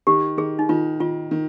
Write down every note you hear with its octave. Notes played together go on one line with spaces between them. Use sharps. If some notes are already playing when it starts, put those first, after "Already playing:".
D#3 G4
D#3 G#4
D#4
D#3 F4
D#3 F4
D#3